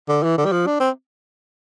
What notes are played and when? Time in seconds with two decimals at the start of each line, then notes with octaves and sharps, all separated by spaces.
0.09 D3
0.23 E3
0.37 D3
0.45 G3
0.52 F3
0.67 D4
0.80 C4